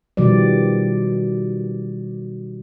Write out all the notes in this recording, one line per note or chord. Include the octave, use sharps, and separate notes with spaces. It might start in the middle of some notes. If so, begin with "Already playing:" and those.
B2 D#3 F3 G3 D5